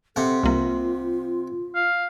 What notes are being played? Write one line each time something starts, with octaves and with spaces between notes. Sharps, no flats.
C3 A4 F#5
C2 A#3 F4
F5